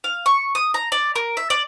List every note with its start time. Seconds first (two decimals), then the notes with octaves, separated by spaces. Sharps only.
0.04 F5
0.26 C#6
0.55 D#6
0.74 A#5
0.92 D5
1.16 A#4
1.37 E5
1.50 D5